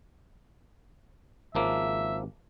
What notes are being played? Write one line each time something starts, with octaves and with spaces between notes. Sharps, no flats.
G#1 C#3 F3 A#3 E5